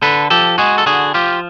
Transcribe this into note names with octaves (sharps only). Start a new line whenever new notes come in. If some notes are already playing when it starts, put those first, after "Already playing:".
D3 A4 B4
F3 G4 A4
G#3 F#4 G#4
A4
D3 F#4 G#4
F3 F4 G4